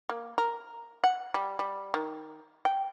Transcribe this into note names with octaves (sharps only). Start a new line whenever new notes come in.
A#3
A#4
F#5
G3
G3
D#3
G5